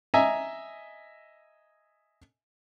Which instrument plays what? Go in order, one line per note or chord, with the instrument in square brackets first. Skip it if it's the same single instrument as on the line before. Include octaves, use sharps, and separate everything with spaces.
[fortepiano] D#5 E5 G#5 A#5